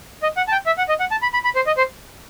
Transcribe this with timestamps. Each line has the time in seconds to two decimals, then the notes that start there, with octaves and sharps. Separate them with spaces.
0.23 D#5
0.37 F#5
0.48 A5
0.52 G5
0.66 E5
0.78 F#5
0.89 D#5
1.00 F#5
1.11 A5
1.22 B5
1.33 B5
1.44 B5
1.56 C5
1.67 D#5
1.77 C5